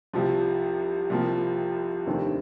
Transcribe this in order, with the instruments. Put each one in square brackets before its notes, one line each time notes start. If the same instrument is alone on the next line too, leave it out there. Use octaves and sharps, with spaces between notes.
[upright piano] C2 C3 F3
C2 C3 F3 A#3
F1 D#2 D3 G3 C4